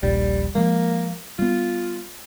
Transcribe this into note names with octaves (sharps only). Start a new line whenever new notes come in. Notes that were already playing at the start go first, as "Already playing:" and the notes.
D#1 A#1 G3
F3 G#3 A#3
G3 B3 F4